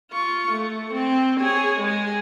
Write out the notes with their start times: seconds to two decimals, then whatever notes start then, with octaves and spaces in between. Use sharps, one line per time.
0.11 F4 C#6
0.52 A3
0.94 C4
1.40 G#4 C#5
1.81 G#3 G#4